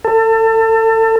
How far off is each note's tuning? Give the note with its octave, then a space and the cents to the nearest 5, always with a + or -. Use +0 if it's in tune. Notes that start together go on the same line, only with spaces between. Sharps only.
A4 +30